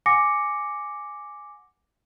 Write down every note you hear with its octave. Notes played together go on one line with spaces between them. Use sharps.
F#5 G#5 D6 A#6 C#7